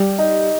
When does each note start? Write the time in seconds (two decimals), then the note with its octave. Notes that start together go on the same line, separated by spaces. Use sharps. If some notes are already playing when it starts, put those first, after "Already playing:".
Already playing: G3 G4
0.18 D#4